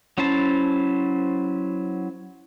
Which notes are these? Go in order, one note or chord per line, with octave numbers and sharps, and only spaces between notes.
F#3 C#4 E4 C5 A5